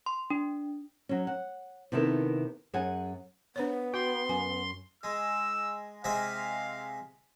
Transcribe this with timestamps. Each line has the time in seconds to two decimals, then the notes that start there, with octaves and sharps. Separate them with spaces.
0.06 C6
0.30 D4
1.09 F#3 C#4
1.27 F#5
1.92 C3 D#3 B3 E4 A4 A#4
2.74 F#2 G#4 F#5 G#5
3.56 B3 D4 C5 C#5
3.94 F#4 G5 C6
4.29 F#2 G#5
5.03 G#3 E6
6.04 C3 G#3 E5 F5